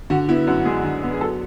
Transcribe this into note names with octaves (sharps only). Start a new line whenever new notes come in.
D3 F#4
B3 E4
F#2 F#4
G#3 G#4
D3
B3
G#4
F#3 A4